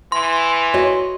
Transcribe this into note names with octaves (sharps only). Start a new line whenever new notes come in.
E3 C6
F#4 C#5 D#5